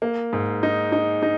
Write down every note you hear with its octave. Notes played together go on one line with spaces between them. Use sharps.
A#3
G#2
D#4
D#4
D#4